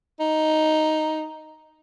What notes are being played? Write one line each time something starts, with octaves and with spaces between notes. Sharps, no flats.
D#4